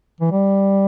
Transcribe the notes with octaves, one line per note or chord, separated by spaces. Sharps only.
E3
G3